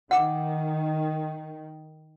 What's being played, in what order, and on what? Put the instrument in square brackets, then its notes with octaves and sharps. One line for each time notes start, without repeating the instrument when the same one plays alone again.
[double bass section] D#3 [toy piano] F#5 D6